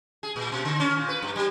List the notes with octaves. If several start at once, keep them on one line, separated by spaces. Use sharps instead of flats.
G#4
A#2
B2
D3
C#4
A#2
B4
G2
G3